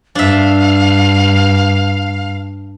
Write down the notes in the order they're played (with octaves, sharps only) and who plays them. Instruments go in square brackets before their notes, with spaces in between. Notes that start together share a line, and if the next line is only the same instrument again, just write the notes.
[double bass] G2 [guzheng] D4 E5 [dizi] F5